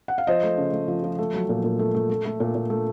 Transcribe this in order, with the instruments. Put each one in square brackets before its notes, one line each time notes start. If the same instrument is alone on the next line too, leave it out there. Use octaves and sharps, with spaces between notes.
[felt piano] F#5
F5
F3 C5 D#5
A3
C#3
A3
F3
F3
A3
F#3
A#2
A#2
A3
A3
A3
A3
A#2
A#2
A3